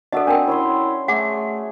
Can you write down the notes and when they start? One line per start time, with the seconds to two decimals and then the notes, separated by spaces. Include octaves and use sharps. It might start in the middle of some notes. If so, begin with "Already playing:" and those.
0.12 D4 F#4 A4 D#5 E5
0.27 C4 D4 A#4 G5 D#6
0.47 C#4 E4 C#5 C6
1.08 A3 G#4 F#5 D6